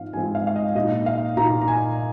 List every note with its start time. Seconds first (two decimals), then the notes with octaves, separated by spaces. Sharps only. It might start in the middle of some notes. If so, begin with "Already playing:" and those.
Already playing: G#2 F3 G#3 C4 F5
0.13 G#2 F3 G#3 C4 G#5
0.35 F5
0.47 F5
0.56 D#5
0.75 A#2 A#3 D#4 D#5
1.06 F5
1.37 A#2 A#3 D#4 A#5
1.61 A#5
1.68 G#5